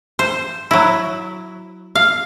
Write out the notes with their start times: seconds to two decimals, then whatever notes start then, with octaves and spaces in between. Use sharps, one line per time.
0.19 C5
0.71 F#3 E4
1.95 F5